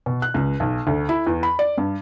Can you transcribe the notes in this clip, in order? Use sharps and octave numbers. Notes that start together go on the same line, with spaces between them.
B2
F#6
C#2
B1
D2
E4
E2
B5
D5
G2